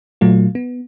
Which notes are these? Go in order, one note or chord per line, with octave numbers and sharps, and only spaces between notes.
A#2 F#3 A3 F4
B3